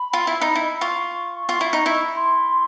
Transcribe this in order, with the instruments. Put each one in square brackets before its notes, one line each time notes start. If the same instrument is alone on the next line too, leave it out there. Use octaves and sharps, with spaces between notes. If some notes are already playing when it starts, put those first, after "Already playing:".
Already playing: [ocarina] B5
[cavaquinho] F4
E4
D#4
E4
[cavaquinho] F4 [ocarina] C#6
[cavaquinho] F4
E4
D#4
E4
[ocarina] C6